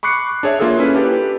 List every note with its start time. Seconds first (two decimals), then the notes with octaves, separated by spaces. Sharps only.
0.03 B5 C#6 D6 F#6 C7 C#7
0.43 D4 G#4 C#5 E5
0.59 A#3 F4 G#4 A4 E5
0.79 C#4 E4 B4
0.94 D4 G4 A4 B4